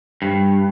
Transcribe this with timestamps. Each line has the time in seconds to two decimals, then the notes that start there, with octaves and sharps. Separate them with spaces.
0.22 G2